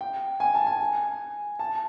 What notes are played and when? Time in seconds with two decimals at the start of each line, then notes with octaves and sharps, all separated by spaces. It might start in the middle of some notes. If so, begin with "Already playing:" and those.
0.01 G5
0.40 G#5
0.55 A5
0.67 G#5
1.59 A5